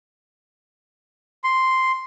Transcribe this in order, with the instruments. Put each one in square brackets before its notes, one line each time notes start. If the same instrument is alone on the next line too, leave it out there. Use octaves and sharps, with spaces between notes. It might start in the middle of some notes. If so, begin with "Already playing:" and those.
[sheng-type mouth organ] C6